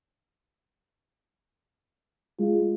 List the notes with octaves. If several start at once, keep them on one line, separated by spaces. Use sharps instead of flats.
G#3 F4